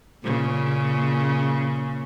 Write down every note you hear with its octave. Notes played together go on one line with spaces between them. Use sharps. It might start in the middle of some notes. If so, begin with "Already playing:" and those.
A#2 C#3